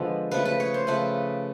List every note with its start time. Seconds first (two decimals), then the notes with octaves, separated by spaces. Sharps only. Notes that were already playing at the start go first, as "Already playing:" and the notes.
Already playing: D3 F3 G#3 B3
0.31 C#3 F3 A3 B4
0.46 B4
0.60 C#5
0.74 C5
0.87 C#3 F3 A3 B4